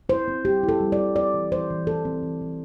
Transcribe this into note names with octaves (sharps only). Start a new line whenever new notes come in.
E4 C5
C4
G3 G4
E4
A4
G3
D5
G3
C4 D5
E3
E3 C5
E3
C4 A4
C4
E3
E3